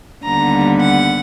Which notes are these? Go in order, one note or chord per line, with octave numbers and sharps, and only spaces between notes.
D#2 D3 G3 B3 A#5
F#5